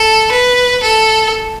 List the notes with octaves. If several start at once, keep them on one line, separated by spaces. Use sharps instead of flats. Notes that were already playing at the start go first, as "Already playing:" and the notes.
Already playing: A4
B4
A4